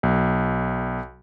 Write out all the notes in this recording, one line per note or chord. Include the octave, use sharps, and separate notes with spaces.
B1